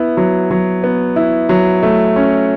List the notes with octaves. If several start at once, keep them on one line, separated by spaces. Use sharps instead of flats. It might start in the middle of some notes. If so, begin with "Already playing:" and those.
Already playing: B3 E4
F#3
F#3
B3
E4
F#3
A3
C#4